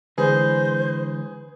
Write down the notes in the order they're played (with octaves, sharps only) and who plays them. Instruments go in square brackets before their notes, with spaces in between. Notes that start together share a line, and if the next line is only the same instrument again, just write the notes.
[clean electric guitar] D3 E3 G#3 [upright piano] G#4 [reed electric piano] B4 [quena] C5